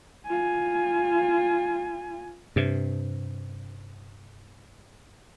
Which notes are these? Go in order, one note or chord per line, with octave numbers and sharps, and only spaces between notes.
F4 G#5
G2 C3